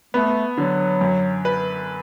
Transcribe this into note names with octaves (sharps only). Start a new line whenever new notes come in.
A3 B3
D3 F#3
F#2
B4